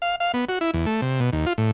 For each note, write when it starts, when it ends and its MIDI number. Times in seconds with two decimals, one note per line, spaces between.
0.02 0.16 77
0.20 0.32 77
0.34 0.45 59
0.49 0.59 66
0.61 0.71 64
0.74 0.86 40
0.86 1.01 57
1.02 1.20 48
1.20 1.30 47
1.33 1.46 39
1.46 1.53 65
1.58 1.71 45